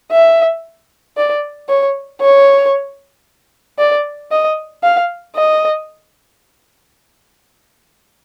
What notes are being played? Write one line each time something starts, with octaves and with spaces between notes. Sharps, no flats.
E5
D5
C#5
C#5
D5
D#5
F5
D#5